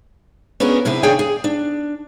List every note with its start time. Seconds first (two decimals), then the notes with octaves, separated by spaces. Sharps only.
0.60 B3 C#4 D4 F#4 G#4 A#4
0.85 F#2 C3 E4 G#4 B4
1.03 D#2 D4 G#4 C#5 G5 G#5
1.19 G#4
1.44 D4